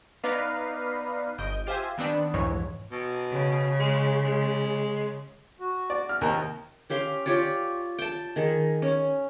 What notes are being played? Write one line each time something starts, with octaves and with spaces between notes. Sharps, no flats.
B3 D#4 B4 D5 F5 A#5
G1 D#5 G6 D7
F4 G4 C5 E5 F5 G#5
D#3 B3 C4 D4
C2 F2 G#2 E3 C#5
B2
C#3
G#3
G#3
F#4
D5
F6
D#2 C3 D#3 D#4 A#4 A#5
C#4 G4 F5 C6
F4 G4 C#5 D5
G5 A5
D#3 G#4
C#4